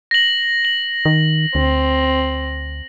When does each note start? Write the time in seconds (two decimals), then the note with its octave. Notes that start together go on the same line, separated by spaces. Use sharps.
0.11 A#6 F#7
0.65 F#7
1.05 D#3
1.55 D2 C4